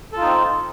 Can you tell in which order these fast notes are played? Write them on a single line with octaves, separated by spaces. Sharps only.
A4 F4 D#4 C4